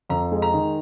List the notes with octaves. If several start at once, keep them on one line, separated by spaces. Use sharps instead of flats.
F2 A#5
G#3
A#5
D#3